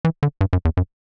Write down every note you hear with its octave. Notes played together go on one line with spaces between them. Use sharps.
E3
D3
G2
F#2
E2
F#2